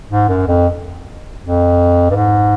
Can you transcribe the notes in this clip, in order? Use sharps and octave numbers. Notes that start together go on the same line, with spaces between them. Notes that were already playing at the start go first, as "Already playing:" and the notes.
G#2
F#2
F2
F2
G2
G#2